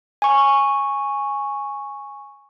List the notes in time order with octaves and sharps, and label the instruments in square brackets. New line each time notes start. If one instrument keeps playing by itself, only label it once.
[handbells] G#5 C#6